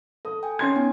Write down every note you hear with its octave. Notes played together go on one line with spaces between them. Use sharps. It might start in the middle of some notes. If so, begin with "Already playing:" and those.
A4 D#6
G5 G#5
C#4 C6 G#6
B3 D#4 G#5